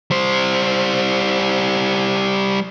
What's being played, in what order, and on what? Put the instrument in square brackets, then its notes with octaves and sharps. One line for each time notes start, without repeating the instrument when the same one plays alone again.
[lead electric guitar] G3 C5